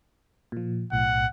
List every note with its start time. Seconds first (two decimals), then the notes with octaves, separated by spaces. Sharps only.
0.52 A#2 F3
0.92 B1 A2 F#5